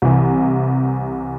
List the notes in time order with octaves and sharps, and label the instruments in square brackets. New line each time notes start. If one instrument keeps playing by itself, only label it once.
[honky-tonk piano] C2 C3 E3